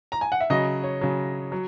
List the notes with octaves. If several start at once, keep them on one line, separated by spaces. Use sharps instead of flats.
A#5
G#5
F#5
E5
C#3 F#3 D#5
C#5
C#3 F#3
F#3